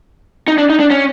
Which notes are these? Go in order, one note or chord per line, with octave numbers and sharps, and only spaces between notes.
D#4
D4
D#4
D4
C#4